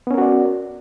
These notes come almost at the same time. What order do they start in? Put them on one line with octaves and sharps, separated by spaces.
B3 C#4 A#4 F#4 D5